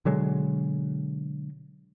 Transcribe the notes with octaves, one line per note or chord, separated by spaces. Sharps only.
B2 D3 F#3 G#3